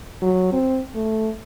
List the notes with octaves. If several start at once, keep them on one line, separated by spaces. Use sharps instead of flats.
F#3
C4
A3